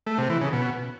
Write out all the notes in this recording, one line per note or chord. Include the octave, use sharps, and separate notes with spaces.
A3
C3
E3
C#3
B2